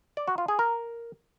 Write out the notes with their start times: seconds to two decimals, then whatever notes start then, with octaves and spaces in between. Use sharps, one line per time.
0.17 D5
0.28 F#4
0.38 F4
0.48 G#4
0.59 A#4